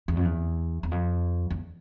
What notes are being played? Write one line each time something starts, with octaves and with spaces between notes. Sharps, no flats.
E2
F2
E2
E2
F2
E2